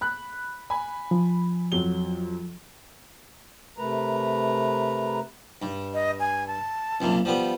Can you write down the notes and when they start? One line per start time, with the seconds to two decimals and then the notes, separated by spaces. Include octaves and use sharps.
0.01 B5 F#6
0.70 G#5 B5
1.11 F3
1.72 F2 F#3 G7
3.78 C3 A3 A#4 B4 A#5
5.62 G2
5.94 D#5
6.20 G#5
6.47 A5
7.00 C2 F#2 A#2
7.25 F3 G3 B3